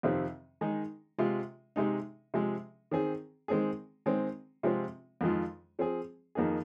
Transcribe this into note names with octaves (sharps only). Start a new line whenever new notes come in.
F2 C3 D#3 C4
D#3 G#3 D#4
C3 G#3 F4
C3 G#3 D#4
C3 F3 G#3
D#3 C4 G#4
D#3 G#3 C4 G#4
D#3 G#3 C4
C3 F3 G#3 C4 F4
F2 D#3 G#3 F4
F3 C4 G#4
F2 D#3 A#3 D#4 G#4